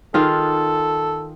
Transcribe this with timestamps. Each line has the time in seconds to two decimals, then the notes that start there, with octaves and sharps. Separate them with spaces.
0.14 D#3 F4 G#4 A4